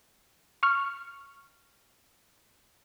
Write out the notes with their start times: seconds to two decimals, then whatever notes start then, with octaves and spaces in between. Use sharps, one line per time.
0.63 C#6 F6